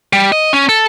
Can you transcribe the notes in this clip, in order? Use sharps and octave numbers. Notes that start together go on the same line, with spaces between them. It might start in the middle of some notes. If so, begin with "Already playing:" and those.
G3
D#5
C#4
A4